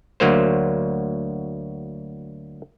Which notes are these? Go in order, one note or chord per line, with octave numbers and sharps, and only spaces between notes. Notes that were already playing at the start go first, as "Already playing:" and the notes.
D2 F#3 A#3 C5